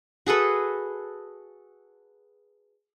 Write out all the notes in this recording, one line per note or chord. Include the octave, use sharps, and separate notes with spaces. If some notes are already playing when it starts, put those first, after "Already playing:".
F#4 G#4 A4 B4